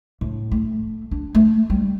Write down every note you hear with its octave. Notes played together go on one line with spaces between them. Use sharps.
A2
A3
D4
A3
G3